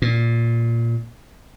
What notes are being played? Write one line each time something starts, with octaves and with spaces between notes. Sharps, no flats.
A#2